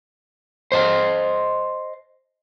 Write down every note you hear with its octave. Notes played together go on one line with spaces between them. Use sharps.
C5 D#5 A5